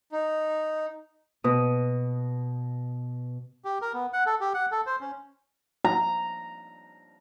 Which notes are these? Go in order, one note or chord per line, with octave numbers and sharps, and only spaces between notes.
D#4
B2 D#6
G4
A#4
B3
F#5
A4
G4
F#5
A4
C5
C#4
A#5